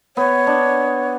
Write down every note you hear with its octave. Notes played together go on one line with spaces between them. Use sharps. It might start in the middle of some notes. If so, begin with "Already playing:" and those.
B3 C#5
D4